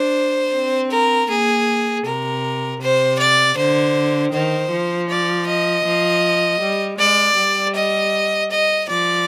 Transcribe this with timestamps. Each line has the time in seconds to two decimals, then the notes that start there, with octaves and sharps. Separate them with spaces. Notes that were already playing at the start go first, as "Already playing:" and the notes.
Already playing: D4 C5
0.53 C4
0.91 A#4
1.29 A#3 G#4
2.05 C3 A#4
2.81 C3 C5
3.18 D5
3.57 D3 C5
4.33 D#3 C5
4.70 F3
5.09 D5
5.47 D#5
5.85 F3
6.61 G3
6.99 G#3 D5
7.36 G3
7.75 D#5
8.51 D#5
8.88 F3 D5